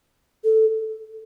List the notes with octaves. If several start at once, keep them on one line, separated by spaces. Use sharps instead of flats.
A4